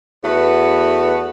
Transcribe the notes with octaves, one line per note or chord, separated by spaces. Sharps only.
E2 A3 B3 F#4 B4